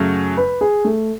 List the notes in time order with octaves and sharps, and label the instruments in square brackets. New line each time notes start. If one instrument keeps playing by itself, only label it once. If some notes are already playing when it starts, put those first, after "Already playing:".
Already playing: [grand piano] F#2 C#3 F#3 A3
[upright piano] B4
G#4
A3